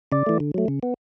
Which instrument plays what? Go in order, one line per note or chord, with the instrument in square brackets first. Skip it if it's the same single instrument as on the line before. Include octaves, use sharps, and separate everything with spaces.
[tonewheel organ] C#3 D5
E3 A3
D3
F#3 A3
C#3
B3